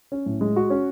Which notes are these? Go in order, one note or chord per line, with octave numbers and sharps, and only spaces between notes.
C#4
A2
G#3
F#4
C#4